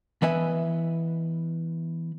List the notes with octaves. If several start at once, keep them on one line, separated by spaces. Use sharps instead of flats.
E3 B3 B4 D#5 E5 G#5